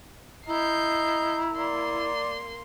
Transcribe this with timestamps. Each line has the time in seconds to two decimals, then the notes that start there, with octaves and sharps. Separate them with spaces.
0.47 E4 D#5 A#5 G6 C7
1.55 A#3 D5 C6